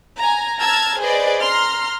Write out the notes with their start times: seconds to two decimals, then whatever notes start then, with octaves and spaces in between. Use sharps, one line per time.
0.18 G#5 A#5
0.60 A5 A#5 E6 F6 G#6
0.99 G#4 B4 C5 D5 D#5
1.41 A#5 C6 F6